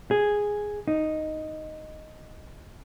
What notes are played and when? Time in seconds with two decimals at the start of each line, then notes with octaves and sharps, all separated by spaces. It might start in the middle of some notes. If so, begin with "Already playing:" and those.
0.11 G#4
0.88 D#4